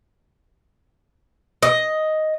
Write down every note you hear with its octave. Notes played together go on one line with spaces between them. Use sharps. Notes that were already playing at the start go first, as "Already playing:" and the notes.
D#5